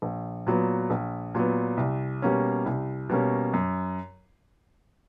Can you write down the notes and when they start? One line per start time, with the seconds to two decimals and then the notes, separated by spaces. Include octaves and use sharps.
0.02 A#1
0.47 A#2 F#3 B3
0.90 A#1
1.35 A#2 F#3 B3
1.77 C2
2.22 B2 G3 A#3 C#4
2.66 C2
3.09 B2 G3 A#3 C#4
3.54 F#2